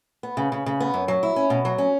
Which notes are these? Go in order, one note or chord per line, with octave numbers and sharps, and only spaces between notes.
B3
C#3
C#3
C#3
B3
F#2
F#3
E4
C#4
B2
F#3
C#4